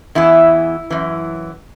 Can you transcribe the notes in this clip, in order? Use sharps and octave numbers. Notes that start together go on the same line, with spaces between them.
E2 E3 E4
F#2 E3